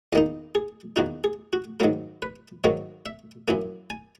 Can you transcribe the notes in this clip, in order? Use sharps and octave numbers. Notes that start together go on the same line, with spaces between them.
E2 D#3 A#3 D#4 D#5
G#4
E2 D#3 A#3 D#4 F#4
G#4
F#4
G#2 D#3 F#3 A#3 A#4
B4
G#2 D#3 F#3 A#3 C#5
E5
F#2 E3 A#3 G#5
G#5